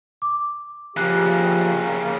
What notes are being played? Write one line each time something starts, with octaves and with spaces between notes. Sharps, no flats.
D6
C#3 F3 A#3 G4 F#6